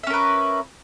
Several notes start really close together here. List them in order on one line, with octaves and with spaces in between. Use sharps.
E5 C#4 A#4 B4